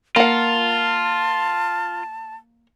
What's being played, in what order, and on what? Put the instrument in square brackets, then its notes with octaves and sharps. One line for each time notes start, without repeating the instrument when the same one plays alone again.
[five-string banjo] A#3 F#5 [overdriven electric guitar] F4 [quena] A5